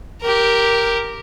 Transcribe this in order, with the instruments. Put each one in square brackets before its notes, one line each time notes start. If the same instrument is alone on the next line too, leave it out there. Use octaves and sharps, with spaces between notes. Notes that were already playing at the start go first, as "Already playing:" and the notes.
[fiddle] G4 A#4